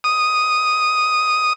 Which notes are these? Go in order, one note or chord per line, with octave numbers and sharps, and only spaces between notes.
D#6